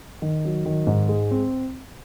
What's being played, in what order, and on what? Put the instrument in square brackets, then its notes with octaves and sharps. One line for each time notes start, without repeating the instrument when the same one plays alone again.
[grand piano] D#3
F#3
D#3
G#2
G#3
C4